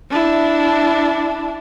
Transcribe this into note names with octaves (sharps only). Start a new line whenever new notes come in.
D4 E4